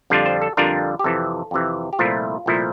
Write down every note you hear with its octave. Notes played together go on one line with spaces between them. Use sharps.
F2 D3 G3 D4 F4
C5
A4
F2 D3 G3 D4 F4 A#4
G4
F2 C3 E3 A4
F2 C3 E3
G4
C2 A#2 F3 A3 E4 F4
C2 A#2 F3 A3 E4